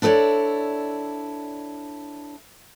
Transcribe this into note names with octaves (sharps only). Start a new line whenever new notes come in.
D4 E4 A4 B4 C#5 D5